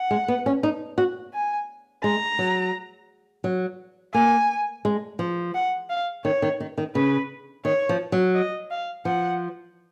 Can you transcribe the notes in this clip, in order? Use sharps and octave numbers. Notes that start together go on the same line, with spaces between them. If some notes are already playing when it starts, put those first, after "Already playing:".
Already playing: F#5
G#3
B3
C#4
D#4
F#4
G#5
G#3 A#5
F#3
F#3
A#3 G#5
G#3
F3
F#5
F5
D#3 C#5
D#3
D#3
D#3
C#3 B4
D#3 C#5
F3
F#3
D#5
F5
F3 F#5